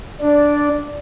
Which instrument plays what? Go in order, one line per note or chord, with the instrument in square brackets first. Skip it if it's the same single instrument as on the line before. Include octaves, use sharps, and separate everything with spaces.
[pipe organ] D4 [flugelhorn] D5